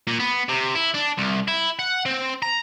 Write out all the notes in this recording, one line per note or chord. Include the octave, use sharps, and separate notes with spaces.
A#2
B3
C3
E4
D4
C2
E4
F#5
C4
A#5